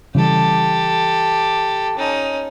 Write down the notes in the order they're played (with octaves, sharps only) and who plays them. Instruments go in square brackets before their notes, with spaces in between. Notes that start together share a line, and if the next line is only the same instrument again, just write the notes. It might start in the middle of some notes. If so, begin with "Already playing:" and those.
[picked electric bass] C#3 E3 G3 [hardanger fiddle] G4 A4
[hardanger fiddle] C#4 D#4